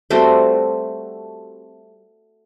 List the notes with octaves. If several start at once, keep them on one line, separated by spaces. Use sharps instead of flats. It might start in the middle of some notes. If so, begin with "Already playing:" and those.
G3 A3 C4 F#4